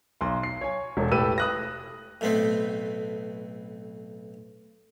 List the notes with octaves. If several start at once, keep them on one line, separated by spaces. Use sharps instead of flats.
B1 C6
C7
C#5 G#5
E1 A4
A2 G4 A4 B4 E6 D#7
D#6 F#6 A#6
B1 A2 A3 B3 C4